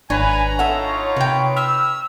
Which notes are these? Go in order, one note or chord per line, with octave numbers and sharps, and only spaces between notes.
G#1 D4 B4 C#5 G#5 A#5
D#4 F4 A4 C#5 E5 F#5
C3 B4 G5
E6 F6